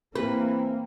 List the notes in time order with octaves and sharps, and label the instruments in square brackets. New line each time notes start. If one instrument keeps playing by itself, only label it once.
[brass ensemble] E3 [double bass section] A#3 [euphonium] C4 [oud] B4